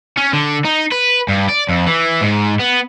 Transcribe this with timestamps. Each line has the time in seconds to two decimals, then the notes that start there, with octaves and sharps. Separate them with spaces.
0.17 C#4
0.33 D3
0.65 D#4
0.92 B4
1.28 G2
1.49 D5
1.69 F2
1.86 E3
2.21 G#2
2.59 B3